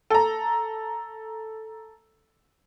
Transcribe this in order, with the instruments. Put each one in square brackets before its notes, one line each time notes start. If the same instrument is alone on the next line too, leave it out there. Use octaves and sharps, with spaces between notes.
[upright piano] A4 A#5